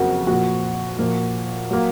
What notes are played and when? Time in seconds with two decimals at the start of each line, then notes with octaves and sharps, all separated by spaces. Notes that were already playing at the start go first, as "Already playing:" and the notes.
Already playing: F2 C#3 F#3 A#3 F#4 A#4
0.27 A#2 F3 A#3 F#4
0.99 A#2 F3 A#3
1.71 F#3 A#3